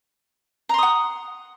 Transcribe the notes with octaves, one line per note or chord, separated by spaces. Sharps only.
F#5 A#5 C6 D#6